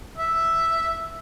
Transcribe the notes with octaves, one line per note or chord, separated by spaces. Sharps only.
E5